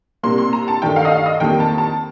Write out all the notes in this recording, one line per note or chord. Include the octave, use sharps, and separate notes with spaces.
C3 G3 A#3 C6
C6
A#5
A5
G2 D#3 A3 G5
F5
D#5
F5
D#5
F2 D#3 G3 A#3 G5
A5
A5